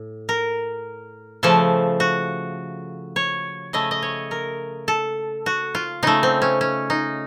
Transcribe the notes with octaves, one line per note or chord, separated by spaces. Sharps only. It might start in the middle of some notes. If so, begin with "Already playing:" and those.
Already playing: A2
A#4
C#3 F3 A3 A4
F#4
C#5
C#3 A3 D#5
D#5
C#5
A#4
A4
F#4
F4
C#3 A3 D#4
C4
C#4
C#4
D#4